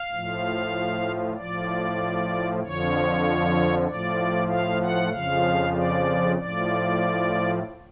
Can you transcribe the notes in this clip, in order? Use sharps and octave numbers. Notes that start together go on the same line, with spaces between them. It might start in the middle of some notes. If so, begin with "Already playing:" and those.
Already playing: F5
A2 F3
A2 F3 D5
F2 D3 F3 C#5
A2 F3 D5
F5
F#5
F2 C#3 F3 F5
D5
A2 F3 D5